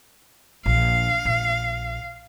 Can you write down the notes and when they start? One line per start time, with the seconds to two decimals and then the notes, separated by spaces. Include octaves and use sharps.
0.66 A#1 F5
1.25 A#1